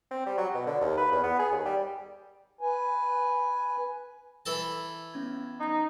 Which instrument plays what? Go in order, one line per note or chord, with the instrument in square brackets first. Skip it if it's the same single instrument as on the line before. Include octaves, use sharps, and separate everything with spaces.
[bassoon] C4
G3
F#3
B2
D3
D#2
B4
E2
B3
G#4
D#2
G3
[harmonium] B4 G#5
[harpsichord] E3 A4 A5
[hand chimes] B3 C#4 G#6
[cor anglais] D#4